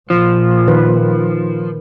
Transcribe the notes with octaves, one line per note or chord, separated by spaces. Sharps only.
A#2 F3
D#3 B4